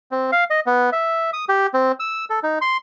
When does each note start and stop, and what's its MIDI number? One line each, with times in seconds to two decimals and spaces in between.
0.11 0.31 60
0.32 0.44 77
0.50 0.60 75
0.66 0.90 59
0.92 1.31 76
1.33 1.45 87
1.49 1.67 67
1.74 1.92 60
2.00 2.25 88
2.30 2.40 69
2.43 2.59 63
2.61 2.77 84